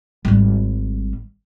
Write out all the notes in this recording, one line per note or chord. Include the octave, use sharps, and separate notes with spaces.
G#1 G3